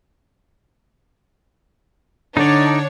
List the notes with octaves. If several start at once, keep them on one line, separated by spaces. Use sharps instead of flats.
D3 D4 D#4 C#5 D5